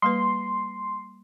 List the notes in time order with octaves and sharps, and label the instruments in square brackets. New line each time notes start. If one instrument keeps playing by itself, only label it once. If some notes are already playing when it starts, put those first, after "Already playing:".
[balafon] G3 A#3 B4 [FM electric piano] C6